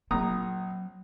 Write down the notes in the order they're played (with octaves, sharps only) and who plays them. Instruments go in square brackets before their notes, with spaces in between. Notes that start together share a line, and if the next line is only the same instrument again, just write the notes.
[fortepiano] A#1 A#5 D#6 [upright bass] F#3 C4